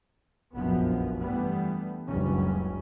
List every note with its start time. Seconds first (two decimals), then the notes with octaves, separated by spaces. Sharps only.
0.55 F1 A#1 F#2 F3 B3
1.20 G2 E3 G3 A3 B3
2.08 F#1 C#2 G2 F#3 C#4